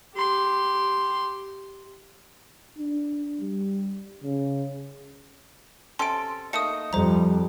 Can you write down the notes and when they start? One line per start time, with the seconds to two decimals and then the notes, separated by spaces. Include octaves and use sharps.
0.15 G4 C6
2.78 D4
3.40 G3
4.24 C#3
5.99 C3 C#4 A4 C6 D7
6.53 A3 A#3 D#4 D#6 C#7
6.93 F2 G3 C5 A#5